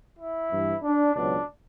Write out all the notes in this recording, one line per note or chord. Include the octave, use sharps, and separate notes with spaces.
E4
G2 E3
D4
C#2 B2 F#3 D4